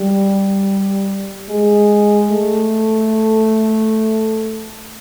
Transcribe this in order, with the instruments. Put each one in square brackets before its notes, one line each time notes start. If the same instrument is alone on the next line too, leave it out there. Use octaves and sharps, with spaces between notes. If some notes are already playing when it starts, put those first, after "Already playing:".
Already playing: [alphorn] G3
G#3
A3